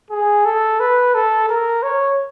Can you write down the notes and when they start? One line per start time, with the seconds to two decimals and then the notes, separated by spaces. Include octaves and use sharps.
0.11 G#4
0.45 A4
0.80 B4
1.15 A4
1.49 A#4
1.83 C#5